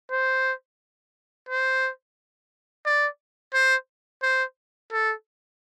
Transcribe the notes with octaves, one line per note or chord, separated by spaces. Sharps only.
C5
C5
D5
C5
C5
A4